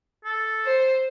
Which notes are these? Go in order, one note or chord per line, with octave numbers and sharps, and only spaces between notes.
A4
C5